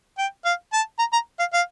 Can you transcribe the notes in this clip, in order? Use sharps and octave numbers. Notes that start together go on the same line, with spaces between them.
G5
F5
A5
A#5
A#5
F5
F5